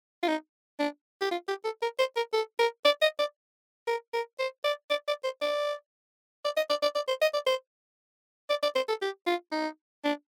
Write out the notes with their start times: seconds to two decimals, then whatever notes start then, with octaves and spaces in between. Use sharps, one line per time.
0.23 F4
0.28 D#4
0.79 D4
1.21 G4
1.31 F4
1.48 G4
1.64 A4
1.82 A#4
1.99 C5
2.16 A#4
2.33 A4
2.59 A#4
2.85 D5
3.02 D#5
3.19 D5
3.87 A#4
4.13 A#4
4.39 C5
4.64 D5
4.90 D5
5.08 D5
5.24 C5
5.42 D5
6.45 D5
6.57 D#5
6.70 D5
6.82 D5
6.95 D5
7.08 C5
7.21 D#5
7.34 D5
7.46 C5
8.50 D5
8.63 D5
8.75 C5
8.88 A4
9.02 G4
9.27 F4
9.52 D#4
10.04 D4